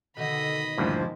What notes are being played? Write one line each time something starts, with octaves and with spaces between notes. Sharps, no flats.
B2 D3 D#3 D#5 B5
D2 G2 A#2 D#3 F3 G#3 A#3 E4